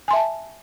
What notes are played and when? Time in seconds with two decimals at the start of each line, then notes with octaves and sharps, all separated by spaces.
0.08 G#5
0.11 C6
0.13 E5
0.16 A5